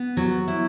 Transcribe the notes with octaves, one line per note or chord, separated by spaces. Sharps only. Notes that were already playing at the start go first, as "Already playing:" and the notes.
Already playing: B3
F#3
E4